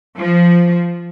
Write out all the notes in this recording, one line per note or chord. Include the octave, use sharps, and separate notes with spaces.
F3